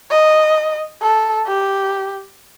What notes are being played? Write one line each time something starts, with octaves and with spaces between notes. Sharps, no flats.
D#5
A4
G4